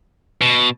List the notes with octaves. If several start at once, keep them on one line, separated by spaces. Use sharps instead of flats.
B2